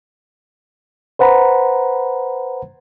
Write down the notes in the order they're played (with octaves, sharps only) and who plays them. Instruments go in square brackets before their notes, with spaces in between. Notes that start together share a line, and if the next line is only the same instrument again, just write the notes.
[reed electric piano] B4 C5 F#5 A#5 B5